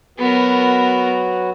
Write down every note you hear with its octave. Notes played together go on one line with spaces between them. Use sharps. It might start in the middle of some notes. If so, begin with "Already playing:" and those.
F#3 B3 F#4 A#4 B4